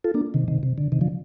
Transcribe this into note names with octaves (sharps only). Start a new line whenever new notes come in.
F4 A4
A#3 D4
C3 D#3
C3 D#3
C3
D3
C3 D#3
D3 F3